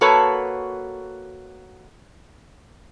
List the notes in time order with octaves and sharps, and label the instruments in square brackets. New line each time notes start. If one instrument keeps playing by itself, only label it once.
[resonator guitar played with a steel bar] A#3 F#4 A4 B4 C#5 A5